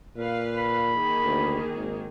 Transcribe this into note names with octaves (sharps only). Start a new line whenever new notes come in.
A#2 B4 F5
B5
D#3 A#3 G#4
D2
G#1